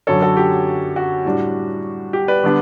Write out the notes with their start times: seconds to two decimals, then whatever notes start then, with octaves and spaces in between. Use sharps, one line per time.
0.07 F#2 D3 F#3 C#4 A4 C#5
0.22 F#4 A4
0.37 G4
0.96 F#4
1.25 A2 G3 D4
2.13 G4
2.28 B4 D5
2.43 D3 G3 B3 D4